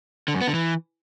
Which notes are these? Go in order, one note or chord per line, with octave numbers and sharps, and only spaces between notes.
D3
F#2
B3
D3
E3